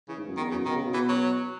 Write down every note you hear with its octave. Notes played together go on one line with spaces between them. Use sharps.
C#3 E3
G#2
F#2
E2 D#3
F#2 C#3
B2 D#3
C#3
B2
E3
F#3